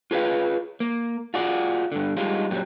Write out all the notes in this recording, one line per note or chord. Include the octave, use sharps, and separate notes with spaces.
F4 G#4 B4 E5 F5
A#3
F4 F#4 G#4 D5
G2 D3
G3 G#3 D#4 F4
F#2 A#2 F#3 G3